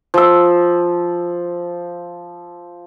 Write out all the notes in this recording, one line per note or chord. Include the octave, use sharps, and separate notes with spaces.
F3 E6